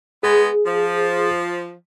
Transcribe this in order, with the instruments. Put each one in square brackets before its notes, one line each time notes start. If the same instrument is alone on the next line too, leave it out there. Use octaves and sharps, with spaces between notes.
[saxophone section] G#3 B3 [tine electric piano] G#4
[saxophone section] F3